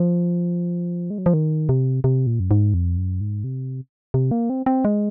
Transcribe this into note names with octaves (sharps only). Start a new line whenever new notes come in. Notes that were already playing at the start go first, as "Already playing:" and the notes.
Already playing: F3
G#3
F#3
F3
D#3
C3
C3
A#2
F#2
G#2
F2
F#2
G#2
C3
C3
A#3
C4
C4
G#3